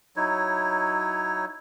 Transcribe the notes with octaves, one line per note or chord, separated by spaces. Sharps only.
F#3 D#4 E4 C#5